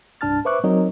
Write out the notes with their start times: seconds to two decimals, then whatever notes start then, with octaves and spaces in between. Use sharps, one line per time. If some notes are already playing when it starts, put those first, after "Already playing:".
0.21 C2 G2 D4 A5 F6 A6
0.45 B4 C5 E5 C#6 D6 F#6
0.64 F#3 C4 D#4 A#4 C#5 D#5